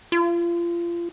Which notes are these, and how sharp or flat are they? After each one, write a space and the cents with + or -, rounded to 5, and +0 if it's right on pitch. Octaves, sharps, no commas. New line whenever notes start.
F4 -30